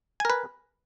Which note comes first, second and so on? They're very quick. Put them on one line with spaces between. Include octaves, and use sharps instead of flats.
G#5 A#4 B4